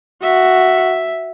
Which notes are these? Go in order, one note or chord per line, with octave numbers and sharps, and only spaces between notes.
F#4 E5